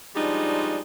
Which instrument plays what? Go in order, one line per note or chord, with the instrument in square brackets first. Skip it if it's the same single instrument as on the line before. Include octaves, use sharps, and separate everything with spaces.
[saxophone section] F3 G3 G#3 D4 D#4